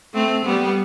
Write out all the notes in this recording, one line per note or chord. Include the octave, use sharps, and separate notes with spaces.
A3 C4
G3 B3